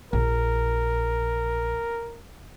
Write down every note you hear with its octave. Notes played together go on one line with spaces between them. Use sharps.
A#1 A#4